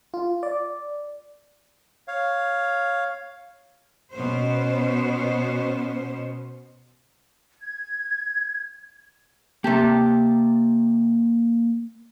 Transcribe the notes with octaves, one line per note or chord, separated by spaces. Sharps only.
F4
D5
C#5 F5
B2 B3 C#4 C5
G#6
C3 A#3 G4 A5